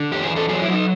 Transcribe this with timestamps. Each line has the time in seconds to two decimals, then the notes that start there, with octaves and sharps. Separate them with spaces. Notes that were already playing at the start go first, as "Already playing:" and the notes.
Already playing: D3
0.12 E2 G4
0.24 G#4
0.30 E3
0.36 A4
0.49 F#3 G#4
0.62 E4
0.68 F#3
0.74 D#4